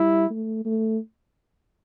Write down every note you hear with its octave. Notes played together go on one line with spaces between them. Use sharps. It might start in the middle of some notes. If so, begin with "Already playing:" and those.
Already playing: G3 E4
A3
A3